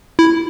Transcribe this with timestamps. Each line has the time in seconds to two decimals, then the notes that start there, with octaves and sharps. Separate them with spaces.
0.19 E4